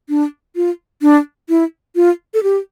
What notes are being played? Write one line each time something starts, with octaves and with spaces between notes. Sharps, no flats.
D4
F4
D4
E4
F4
A4
G4